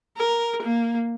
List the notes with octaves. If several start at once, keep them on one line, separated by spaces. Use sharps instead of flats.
A#4
A#3